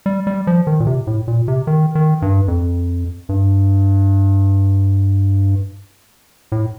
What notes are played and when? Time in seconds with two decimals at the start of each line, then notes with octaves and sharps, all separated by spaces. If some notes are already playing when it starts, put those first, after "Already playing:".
0.06 G3
0.27 G3
0.47 F3
0.67 D#3
0.80 A#2
0.87 C3
1.07 A2
1.28 A#2
1.48 C3
1.67 D#3
1.95 D#3
2.22 G2
2.48 F2
3.29 G2
6.52 A2